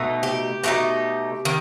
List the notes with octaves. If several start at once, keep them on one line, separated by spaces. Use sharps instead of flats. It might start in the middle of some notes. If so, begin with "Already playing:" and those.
Already playing: B2 A3 D#4
G4
B2 A3 D#4 G4
D#3